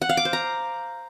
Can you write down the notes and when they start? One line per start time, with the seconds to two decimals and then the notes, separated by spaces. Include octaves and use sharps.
0.02 F#5
0.09 F5
0.17 D6
0.25 C5
0.33 A#5